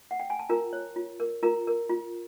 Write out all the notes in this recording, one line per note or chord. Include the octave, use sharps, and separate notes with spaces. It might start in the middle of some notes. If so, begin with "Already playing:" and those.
F#5
G5
G#5
A5
F4 A#4 A#5
C#5
F4
A#4
F4 A#4 A#5
A#4
F4